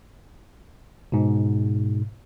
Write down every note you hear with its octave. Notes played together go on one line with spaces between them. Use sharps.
G#2 B2